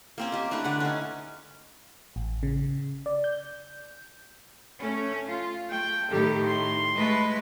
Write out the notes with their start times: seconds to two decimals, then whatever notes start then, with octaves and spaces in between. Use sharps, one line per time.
0.18 A#3 C4 C#4
0.32 G4 D#5
0.51 A3 D4 E4 B4
0.64 D3 F#5
0.80 C#4 D#4
2.16 A1
2.43 C#3
3.06 D5
3.24 G6
4.81 A3 C#4
5.26 F4
5.69 A3 G5
6.10 A2 D#3 G4 A4
6.46 C6
6.96 G#3 A3 B4